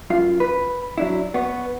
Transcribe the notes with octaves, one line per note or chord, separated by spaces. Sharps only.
F#2 F4 F5
B4
F#3 D4 E4
B3 C#5